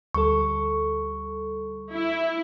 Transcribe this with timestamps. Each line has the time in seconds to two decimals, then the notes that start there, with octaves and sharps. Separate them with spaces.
0.14 D2 G3 A4 C#6
1.93 E4